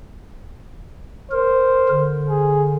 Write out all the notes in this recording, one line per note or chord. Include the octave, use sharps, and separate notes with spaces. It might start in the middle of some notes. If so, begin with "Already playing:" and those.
A#4 C5
D3
G#4